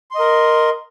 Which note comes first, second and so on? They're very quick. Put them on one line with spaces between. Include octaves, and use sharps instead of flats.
C6 D#5 A#4